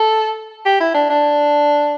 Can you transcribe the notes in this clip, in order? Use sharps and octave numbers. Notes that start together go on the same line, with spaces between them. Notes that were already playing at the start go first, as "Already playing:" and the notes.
Already playing: A4
G4
E4
D4
D4